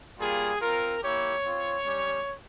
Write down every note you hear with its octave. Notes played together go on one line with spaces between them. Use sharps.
G3 A#3 F4 G#4
C4 F4 A#4
A#3 E4 G4 C#5
C4 F4
G3 C#4 G4